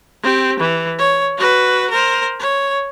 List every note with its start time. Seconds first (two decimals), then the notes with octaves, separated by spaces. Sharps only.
0.23 C4 G4
0.59 E3
0.99 C#5
1.38 F#4 B4
1.90 A#4 C5
2.40 C#5